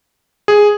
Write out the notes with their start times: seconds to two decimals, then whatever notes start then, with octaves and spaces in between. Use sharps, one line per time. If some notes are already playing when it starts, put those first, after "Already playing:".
0.48 G#4